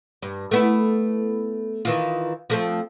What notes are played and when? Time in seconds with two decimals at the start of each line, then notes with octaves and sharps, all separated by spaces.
0.22 G2
0.51 A3 B3 E4
1.85 D#3 E3 F4
2.50 F3 A3 C4